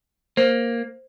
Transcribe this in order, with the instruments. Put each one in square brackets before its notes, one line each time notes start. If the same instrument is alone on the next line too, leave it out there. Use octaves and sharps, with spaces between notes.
[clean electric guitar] A#3 [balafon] C5